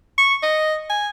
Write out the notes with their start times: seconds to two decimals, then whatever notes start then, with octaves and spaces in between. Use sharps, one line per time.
0.18 C#6
0.43 D#5
0.90 G#5